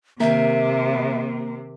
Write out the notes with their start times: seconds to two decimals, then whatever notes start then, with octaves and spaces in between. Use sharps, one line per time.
0.20 C3 D#3 A#3 A#4 E5